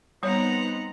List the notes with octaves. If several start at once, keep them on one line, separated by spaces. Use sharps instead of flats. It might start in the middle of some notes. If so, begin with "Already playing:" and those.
G3 B3 C4 D#4 C#5 F#5 A#5